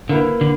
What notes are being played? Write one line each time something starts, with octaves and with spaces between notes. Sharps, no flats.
D3 A#3 E4 B4
D3